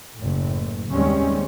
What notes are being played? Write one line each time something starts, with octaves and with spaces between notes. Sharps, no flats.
F#1 A2
D#2 G3 G#3 C4 C#4